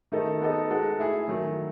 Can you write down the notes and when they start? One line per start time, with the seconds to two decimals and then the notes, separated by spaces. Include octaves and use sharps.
0.12 D#3 A3 D#4 A4
0.41 B3 D#4 A4 D#5
0.70 G#3 D#4 F#4 A4
0.99 A3 E4 G#4
1.28 D#3 F#3 A3